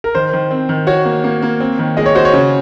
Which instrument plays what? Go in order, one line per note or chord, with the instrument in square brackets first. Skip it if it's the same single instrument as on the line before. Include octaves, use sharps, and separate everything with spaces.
[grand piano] A#4
[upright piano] D#3 [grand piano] C5
[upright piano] D#3
C4
D#3
[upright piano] F#4 [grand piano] C#5
[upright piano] A#3
A#3
A#3
C4
D#3
[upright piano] G#3 [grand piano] D#5
[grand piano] C#5
[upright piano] F#4 [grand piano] C5
[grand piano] C#5
[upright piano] C#3